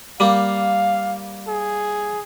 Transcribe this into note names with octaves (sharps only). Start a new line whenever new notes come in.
G3 A#3 F5
G#4